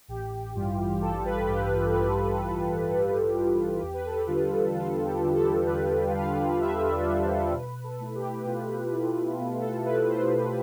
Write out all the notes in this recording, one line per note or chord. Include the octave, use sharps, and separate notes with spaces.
A1 G4
G2 E3 G3 F4
A1 A4
B4
G2 E3 G3 G4
A1 G4
G2 E3 G3 A4
A1 A4
B4
G2 E3 G3
G4
F4
E2 G4
B4
A4
G4
D3 G3 D4 F4
E2 F4
G4
D3 G3 D4
A4
E2 B4
D3 G3 D4 F5
E2 E5
D5
D3 G3 D4
C5
B2 B4
A4
A3 E4
G4
G4
B2 F4
A3 E4
B2
A4
A3 E4 B4
C5
B2